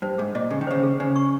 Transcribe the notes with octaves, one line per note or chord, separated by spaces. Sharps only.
G2 C5
G#2 G#4
A#2 D#5
C#3 G#4
D#3
C#3 C5
G#4
C#3 C#5
C#6